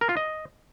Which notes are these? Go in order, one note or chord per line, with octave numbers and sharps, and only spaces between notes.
A#4
F4
D#5